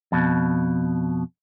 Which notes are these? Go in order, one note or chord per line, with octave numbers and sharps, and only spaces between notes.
F2 B2